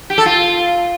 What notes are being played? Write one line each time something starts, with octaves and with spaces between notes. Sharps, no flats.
G4
A4
F4